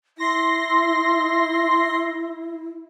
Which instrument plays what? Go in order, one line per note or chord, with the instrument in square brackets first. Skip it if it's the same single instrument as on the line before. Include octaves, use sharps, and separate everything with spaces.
[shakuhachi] E4 [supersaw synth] C6 A#6